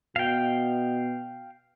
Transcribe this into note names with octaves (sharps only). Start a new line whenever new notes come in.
B2 F5 G5